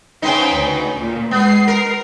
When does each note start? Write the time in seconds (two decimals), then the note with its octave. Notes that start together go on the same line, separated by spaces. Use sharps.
0.22 C#3 B3 D#4 C5 G5 G#5
0.54 D2
0.98 A#2
1.31 G#3 B3 C7
1.68 A#4